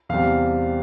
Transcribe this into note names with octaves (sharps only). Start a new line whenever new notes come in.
E2 C3 G3 F5